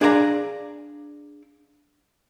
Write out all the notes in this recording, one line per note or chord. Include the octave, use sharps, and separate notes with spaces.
D4 G#4 D5 F5 G#5 A#5